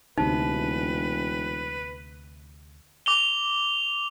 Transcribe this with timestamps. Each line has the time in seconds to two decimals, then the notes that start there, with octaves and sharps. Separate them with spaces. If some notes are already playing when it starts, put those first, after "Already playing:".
0.18 E1 D2 C3 D#4 B4
3.06 D6 F7 G7